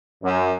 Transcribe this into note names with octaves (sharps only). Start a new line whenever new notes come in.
F#2